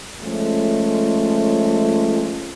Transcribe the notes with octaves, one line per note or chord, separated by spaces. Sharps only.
F3 G#3 A3 C#4 F4